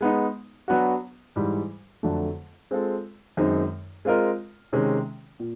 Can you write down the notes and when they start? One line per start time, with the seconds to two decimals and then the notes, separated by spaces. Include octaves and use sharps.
0.01 G#3 B3 D#4
0.68 F#3 B3 D4 F#4
1.36 G#2 E3 G3
2.03 F2 D3 F#3 A3
2.71 G#3 C4 F4 A4
3.37 F#2 D#3 G#3 C4 D#4
4.05 G#3 C4 F4 A#4 D#5
4.73 C3 D#3 G#3 C#4
5.40 A#2